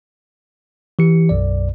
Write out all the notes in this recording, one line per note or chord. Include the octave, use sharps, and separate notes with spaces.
E3 G4 C#7
B1 F#2 D5